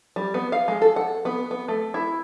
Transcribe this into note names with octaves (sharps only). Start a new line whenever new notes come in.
G3
B3
F5
G#3
A4
F#5
B3
B3
A3
E4